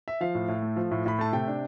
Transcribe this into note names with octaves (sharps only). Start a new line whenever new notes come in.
E5
F3 F5
A2
A2
A3
F3
A2
A2 B5
A3 A5
C3 G5
D4